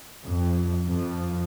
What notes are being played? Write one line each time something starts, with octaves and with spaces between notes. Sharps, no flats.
F2
F2 F3